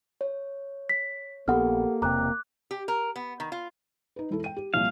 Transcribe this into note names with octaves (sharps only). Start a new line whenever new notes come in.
C#5
B6
A#1 A#3 B3 G4 A4 F#5 F6
E1 C3 A#5 D6 F#6
G4
A#4
B3
D#3
F4
D#4 B4
E1 E4 A4
G5 D#7
G4
C2 A#2 F3 F5